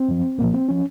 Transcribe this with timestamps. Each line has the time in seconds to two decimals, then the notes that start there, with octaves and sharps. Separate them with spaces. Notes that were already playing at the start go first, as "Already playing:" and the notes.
Already playing: C4
0.08 F#2 F3
0.38 C2 A#2 F3 A#3
0.54 C4
0.69 F3 C#4